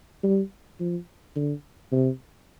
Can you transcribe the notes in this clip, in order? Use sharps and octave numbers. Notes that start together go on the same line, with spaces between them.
G3
F3
D3
C3